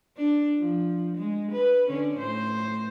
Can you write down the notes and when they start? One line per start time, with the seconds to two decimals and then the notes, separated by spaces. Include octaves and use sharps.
0.17 D4
0.59 F3
1.17 G#3
1.52 B4
1.87 D3 C#4 D4
2.19 A2 C5